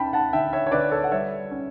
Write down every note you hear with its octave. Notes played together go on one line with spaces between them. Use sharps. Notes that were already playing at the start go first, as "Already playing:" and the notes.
Already playing: C#4 G5 A5 B5
F#5 A5
D3 E5 G5
C#5 E5
C#5
D3 B4 D5
A4 C#5
F#5
G3 C#5 E5
C#4